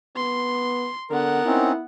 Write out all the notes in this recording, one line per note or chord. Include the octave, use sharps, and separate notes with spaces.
B3 C6
D3 B3 A#4 F#5
C4 C#4 D#4 E4